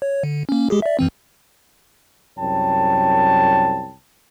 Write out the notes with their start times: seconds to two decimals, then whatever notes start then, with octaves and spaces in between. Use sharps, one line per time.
0.02 C#5
0.23 D3
0.49 A#3 C#4
0.70 G#3 G4 G#4
0.82 D5 E5
0.99 F#2 E3 C4
2.38 C2 F#2 C#5 G5 A5